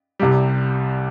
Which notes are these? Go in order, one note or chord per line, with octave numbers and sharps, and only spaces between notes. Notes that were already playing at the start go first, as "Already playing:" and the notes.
C2 C3 G3